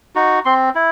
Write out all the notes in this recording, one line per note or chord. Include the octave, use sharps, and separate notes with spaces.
D#4 F#4
C4 C6
E4